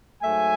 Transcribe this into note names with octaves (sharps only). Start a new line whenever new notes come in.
G#2 F#3 A3 E5 G#5